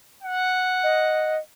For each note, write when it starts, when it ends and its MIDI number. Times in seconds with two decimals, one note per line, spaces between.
0.23 1.38 78
0.84 1.38 75